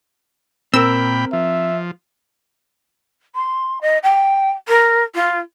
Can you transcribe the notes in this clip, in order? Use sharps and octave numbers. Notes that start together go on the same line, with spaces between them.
A#2 C4 A#4 G5 B5 E6
F3 E5
C6
D#5
G5
A#4
F4